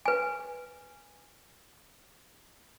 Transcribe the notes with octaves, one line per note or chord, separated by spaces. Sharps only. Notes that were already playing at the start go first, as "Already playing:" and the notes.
B4 G#5